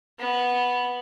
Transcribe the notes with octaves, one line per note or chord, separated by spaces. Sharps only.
B3